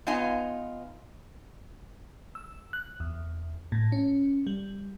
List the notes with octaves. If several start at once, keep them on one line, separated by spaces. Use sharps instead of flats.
B3 D#4 F4 D#5 G#5
E6
F#6
E2
A2
C#4
G3